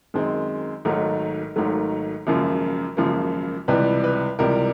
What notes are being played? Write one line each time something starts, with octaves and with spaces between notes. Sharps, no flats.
F#2 D#3 G#3 C4
G#1 G#2 D#3 F#3 A3 A#4
G#1 G#2 D#3 F#3 A3
G#1 F#2 C#3 F3 A#3
G#1 F#2 C#3 F3 A#3
C#2 C3 E3 G3 B4
B4
C#2 C3 E3 G3 A#4